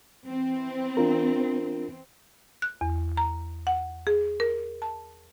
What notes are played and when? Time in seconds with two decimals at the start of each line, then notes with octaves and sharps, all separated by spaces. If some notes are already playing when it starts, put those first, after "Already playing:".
0.23 E3 C4
0.97 D4 F4 A#4
2.62 F#6
2.81 E2
3.17 A#5
3.67 F#5
4.07 G#4
4.40 A#4
4.82 A5